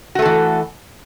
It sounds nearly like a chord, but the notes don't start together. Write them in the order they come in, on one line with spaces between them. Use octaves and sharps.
F#4 A3 A4 E3